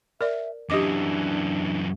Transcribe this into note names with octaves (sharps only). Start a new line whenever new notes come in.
A#4 D5 E5
F#2 E3 D4 G4 D#5 D6